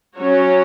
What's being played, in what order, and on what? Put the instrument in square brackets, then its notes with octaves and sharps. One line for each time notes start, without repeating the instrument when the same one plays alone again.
[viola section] F#3 C#4 F#4 C#5